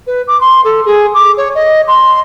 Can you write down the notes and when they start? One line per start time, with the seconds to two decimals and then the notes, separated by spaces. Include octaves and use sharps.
0.07 B4
0.27 D6
0.40 C6
0.64 A4
0.85 G#4
1.14 D6
1.37 C#5
1.55 D#5
1.87 C6